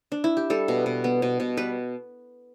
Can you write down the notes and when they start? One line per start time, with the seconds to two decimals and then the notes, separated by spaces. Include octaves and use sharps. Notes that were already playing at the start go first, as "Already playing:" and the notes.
0.12 D4
0.24 E4
0.37 G4
0.50 G3 A4
0.68 B2
0.86 B2
1.04 B3
1.22 B2
1.40 B2
1.57 G3 B4